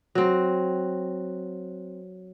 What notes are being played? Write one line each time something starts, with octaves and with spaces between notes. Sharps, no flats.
F#3 C4